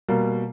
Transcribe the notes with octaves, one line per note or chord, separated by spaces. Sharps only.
B2 G3 A#3